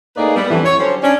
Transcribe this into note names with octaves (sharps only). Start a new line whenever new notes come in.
A2 A#3 D#4 G#4 B4 D5
G3 B3
F2 A2 D3 E3
C#5
D3 F#3 G3 C#4 C5
C#4 D4